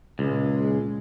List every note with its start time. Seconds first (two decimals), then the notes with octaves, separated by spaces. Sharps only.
0.19 C#2 A#2 G#3